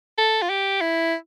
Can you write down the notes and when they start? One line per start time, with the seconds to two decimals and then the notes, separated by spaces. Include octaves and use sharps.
0.18 A4
0.42 F4
0.50 G4
0.81 E4